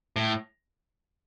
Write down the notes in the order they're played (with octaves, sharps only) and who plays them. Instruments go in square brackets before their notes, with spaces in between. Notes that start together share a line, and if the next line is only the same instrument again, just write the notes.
[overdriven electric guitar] A2